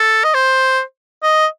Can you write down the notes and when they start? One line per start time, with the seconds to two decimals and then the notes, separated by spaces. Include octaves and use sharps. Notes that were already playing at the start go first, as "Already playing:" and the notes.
Already playing: A4
0.24 D#5
0.34 C5
1.23 D#5